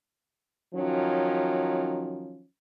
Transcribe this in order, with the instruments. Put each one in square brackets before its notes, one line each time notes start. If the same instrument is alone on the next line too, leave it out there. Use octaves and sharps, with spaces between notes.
[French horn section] D#3 F3 F#3 C#4